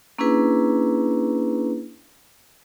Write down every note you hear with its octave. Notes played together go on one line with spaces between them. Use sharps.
A#3 C#4 D4 E4 G#4 B4